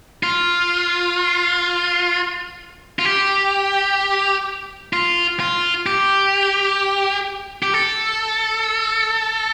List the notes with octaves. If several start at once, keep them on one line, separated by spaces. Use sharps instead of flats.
F4
F4
G4
F4
F4
G4
G4
A4